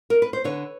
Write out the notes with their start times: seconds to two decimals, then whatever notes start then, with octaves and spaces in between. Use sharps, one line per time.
0.10 A#4
0.22 B4
0.33 C5
0.44 D3 B4 C#5